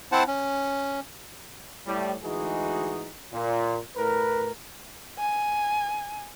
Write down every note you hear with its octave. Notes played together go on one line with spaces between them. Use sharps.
C4 E4 C5 F#5 A5
C#4
A2 G3
D2 E3 G#3 D#4 F#4 G#4
A#2
A2 A#4 B4
G#5